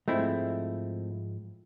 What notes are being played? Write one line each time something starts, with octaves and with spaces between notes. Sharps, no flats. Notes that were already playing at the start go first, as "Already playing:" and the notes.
G#2 F3 G#3 A3 C4 E4